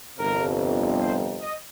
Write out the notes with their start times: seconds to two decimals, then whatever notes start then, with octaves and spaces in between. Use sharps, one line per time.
0.18 G1 F2 C3 A#4
1.00 C5
1.40 D#5